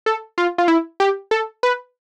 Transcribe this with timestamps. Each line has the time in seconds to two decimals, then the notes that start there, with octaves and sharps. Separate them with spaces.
0.06 A4
0.38 F4
0.58 F4
0.68 E4
1.00 G4
1.31 A4
1.63 B4